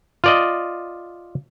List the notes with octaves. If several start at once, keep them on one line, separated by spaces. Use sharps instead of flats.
F4 D5 D#5